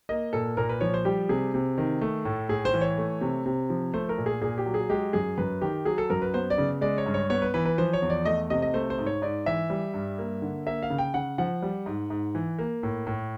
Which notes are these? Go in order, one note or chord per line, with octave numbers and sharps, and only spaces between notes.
A#3 D#5
A#2 A4
A#2 A#4
B4
F3 C#5
C5
G3 G4
C3 G#4
C3
D#3
A3
A2
A2 G#4
C5
E3
C#5
A3
C3
C3
F3
A3 C5
A#4
A#2
G#4
A#2 G#4
G4
F#3
G#4
G#3 G4
F#2 G#4
F#2 B4
D#3 G4
F#3 G#4
A4
F#2 A#4
B4
B3 C5
D5
C#3
G#3 D5
C#5
G2
C#5
B3 C#5
B4
E3 B4
B4
F3 C5
C#5
E2
D5
A3 D#5
C3 D#5
D#5
A3 C5
C5
G#2
C#5
G#2 D5
E3 E5
G3
G2
A#3
D3
A#3 E5
F5
C#3
G5
C#3 F#5
F3 F#5
G3
G#2
G#2
E3
A#3
A2
A2